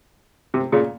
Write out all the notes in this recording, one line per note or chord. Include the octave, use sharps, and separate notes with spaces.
C3
A#2 C#3